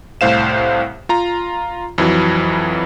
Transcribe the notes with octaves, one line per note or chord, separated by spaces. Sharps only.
C2 A2 C5 F5 E7
F4 A#5
F2 E3 F#3